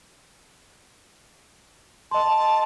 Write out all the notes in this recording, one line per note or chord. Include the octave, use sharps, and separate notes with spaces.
D#5 A5 C6